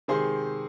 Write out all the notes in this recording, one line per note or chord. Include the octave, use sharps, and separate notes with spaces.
C3 D#3 G#3 G#4 C5